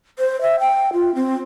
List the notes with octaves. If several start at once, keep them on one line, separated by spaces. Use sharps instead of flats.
C5
E5
G5
F4
C4